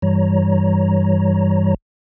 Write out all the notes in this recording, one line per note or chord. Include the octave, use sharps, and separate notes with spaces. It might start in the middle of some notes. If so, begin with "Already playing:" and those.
G2 E3 G3 C#5 A#5